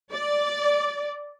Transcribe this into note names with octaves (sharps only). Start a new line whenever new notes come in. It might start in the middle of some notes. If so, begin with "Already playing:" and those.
D5